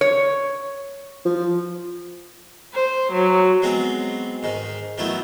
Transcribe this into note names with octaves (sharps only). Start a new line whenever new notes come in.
C#5
F3
C5
F#3
F#3 G#3 B3 C4
G#2 D#3
D#3 F#3 A3 B3 E4